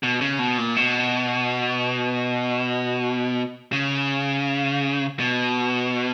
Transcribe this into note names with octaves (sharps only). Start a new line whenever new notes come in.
B2
C#3
B2
A#2
B2
C#3
B2